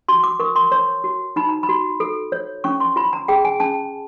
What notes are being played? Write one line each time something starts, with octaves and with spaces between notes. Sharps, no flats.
F#4 C6
D6
A#4 C#6
C6
C#5 C6
F#4
D#4 B5
A#5
B5
F#4
A4
C#5
C#4 C#6
C6
F4 B5
A#5
G#4 G5
G#5
C#4 A5